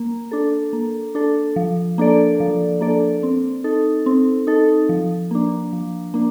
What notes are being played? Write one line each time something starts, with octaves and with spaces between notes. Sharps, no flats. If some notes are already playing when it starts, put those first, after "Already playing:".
Already playing: A#3
D4 A4
A#3
D4 A4
F3
A#3 D4 A4 D5
F3
A#3 D4 A4 D5
C4
D#4 A4
C4
D#4 A4
F3
A#3 D4
F3
A#3 D4